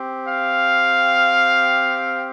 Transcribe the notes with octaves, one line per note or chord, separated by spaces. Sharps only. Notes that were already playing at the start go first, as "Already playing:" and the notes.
Already playing: C4 G4
F5